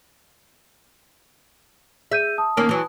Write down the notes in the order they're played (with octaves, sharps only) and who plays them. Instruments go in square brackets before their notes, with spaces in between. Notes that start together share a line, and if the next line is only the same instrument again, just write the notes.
[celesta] G#4 G6 D#7 [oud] E5
[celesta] A5 D#6
[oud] D#2 A#3 C#4
E3 F#3